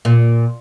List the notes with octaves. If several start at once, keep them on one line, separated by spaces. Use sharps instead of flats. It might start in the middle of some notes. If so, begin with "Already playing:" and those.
A#2